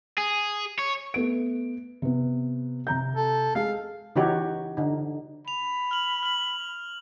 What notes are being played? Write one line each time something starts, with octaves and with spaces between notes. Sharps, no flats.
G#4
C#5
A3 B3 D7
C3 B3
C3 A#5 G6
A4
G#3 G#4 F5 C7
C#3 E3 D#4 F#4 G4 C#5
D3 D#4
B5 F7
F6 F#7
F6 F#7